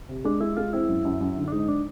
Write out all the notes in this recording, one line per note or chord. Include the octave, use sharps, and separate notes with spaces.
C3
G#3 D4
G#3 E4
G#3 F4
C4 E4
F#2
F#2
F#2
D3
D4
G#2 D#4
D4